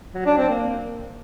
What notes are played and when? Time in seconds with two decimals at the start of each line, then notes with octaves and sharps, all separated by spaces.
0.14 F#3
0.26 D4
0.37 C4
0.49 A#3